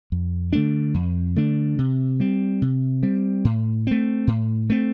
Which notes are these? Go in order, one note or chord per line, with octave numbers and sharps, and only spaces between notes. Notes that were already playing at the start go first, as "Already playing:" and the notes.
F2
D3 A3 D4
F2
D3 A3 D4
C3
G3 C4
C3
G3 C4
A2
A3 C4
A2
A3 C4